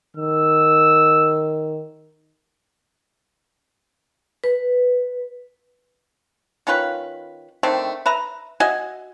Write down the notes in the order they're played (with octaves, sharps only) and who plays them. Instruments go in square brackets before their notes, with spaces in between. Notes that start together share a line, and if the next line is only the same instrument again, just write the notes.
[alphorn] D#3 [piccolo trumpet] E6
[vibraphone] B4
[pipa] D#3 C#4 F4 B4
D3 D#3 A3 C4
B4 E5 A#5
F#4 D#5 E5 G#5